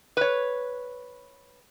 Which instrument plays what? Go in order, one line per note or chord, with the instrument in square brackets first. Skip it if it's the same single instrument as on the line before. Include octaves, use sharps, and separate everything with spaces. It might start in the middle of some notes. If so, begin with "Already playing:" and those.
[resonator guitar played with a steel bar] B4 C#5